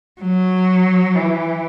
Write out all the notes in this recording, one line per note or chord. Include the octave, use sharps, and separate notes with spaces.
F#3
E3